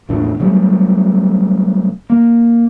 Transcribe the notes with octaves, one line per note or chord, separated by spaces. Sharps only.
A#1 E2 A2 D4
C3 F#3 G3 A3
A#3